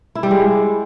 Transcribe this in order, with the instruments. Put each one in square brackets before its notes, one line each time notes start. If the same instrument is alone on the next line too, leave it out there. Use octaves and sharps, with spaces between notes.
[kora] E4
G3
G#3